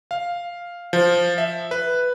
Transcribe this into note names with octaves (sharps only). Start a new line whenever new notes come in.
F5
F3
E5
B4